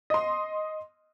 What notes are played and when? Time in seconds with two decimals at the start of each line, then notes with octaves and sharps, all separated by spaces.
0.10 D#5 C6